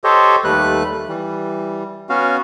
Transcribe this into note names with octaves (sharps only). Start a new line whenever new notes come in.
G4 A4 C5 C#5 D#5
D#2 G3 A3 B4 F#6
E3 G3
B3 C#4 F#4 F5